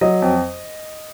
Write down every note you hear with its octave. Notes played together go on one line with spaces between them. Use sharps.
F#3 D#5
F2